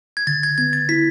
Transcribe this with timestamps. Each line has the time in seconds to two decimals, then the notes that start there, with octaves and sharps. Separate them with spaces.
0.17 G#6
0.27 D3 A6
0.43 G#6
0.58 B3 G#6
0.73 A6
0.89 E4 B6